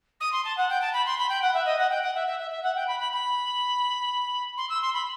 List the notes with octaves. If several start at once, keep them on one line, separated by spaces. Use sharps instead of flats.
D#6
C6
A5
F#5
G5
A5
B5
C6
B5
G5
F#5
E5
D#5
F#5
G5
F#5
E5
E5
E5
E5
F#5
G5
B5
B5
B5
C6
E6
C6
B5